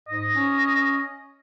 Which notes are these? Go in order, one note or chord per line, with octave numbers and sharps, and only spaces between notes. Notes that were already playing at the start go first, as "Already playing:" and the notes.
G#2 D#5
C#4